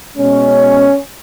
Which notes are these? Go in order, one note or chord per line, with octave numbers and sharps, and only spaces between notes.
B2 G#3 C#4